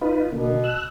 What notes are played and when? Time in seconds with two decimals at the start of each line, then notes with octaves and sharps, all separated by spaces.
0.01 D#4 F4 B4
0.32 B2 D3 A#3
0.64 E6 F#6